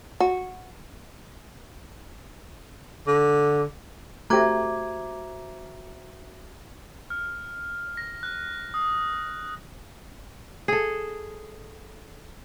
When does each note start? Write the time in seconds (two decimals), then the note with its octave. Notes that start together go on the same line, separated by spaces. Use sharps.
0.20 F#4
3.07 D3
4.30 A3 F#4 G4 C5 E5 A#5 D6 G#6
7.10 F6
7.97 A#6
8.23 F#6
8.74 D#6
10.68 G#4 A4